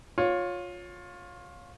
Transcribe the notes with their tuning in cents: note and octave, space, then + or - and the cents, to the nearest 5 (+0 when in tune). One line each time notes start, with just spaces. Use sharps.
F4 +20 C#5 +0